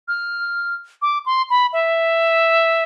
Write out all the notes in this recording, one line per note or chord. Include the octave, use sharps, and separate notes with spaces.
F6
D6
C6
B5
E5